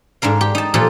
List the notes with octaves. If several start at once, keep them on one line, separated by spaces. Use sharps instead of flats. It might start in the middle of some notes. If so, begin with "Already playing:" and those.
G#2 D4 A#4 F5
G4
D#4 A5
A#2 F3 F4 G4 A4